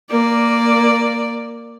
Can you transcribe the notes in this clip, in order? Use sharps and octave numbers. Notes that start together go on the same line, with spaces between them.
A#3 D5